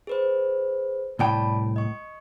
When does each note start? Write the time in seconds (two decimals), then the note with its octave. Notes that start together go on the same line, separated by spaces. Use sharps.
0.07 G#4 B4 C5
1.19 C2 A2 D5 G5 A5 B5
1.76 D#5 C#6